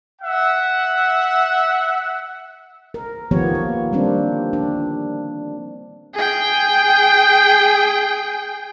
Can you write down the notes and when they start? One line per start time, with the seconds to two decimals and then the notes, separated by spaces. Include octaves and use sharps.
0.22 E5 F#5
2.94 A#4
3.31 D#3 F3 A#3 B3 G4 C#5
3.55 A#3
3.93 G3 A#3 C4 D4
4.53 D4
6.14 G#4 G5